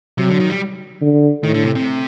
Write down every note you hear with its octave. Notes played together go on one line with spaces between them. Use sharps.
C3 F#3
D3
D#3
G3
D3
A2 D#3
D3
C3
C3